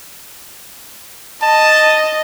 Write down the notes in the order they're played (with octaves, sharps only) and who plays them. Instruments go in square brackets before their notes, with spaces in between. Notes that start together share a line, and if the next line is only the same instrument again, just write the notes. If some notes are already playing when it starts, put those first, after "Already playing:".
[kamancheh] D#5 [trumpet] A5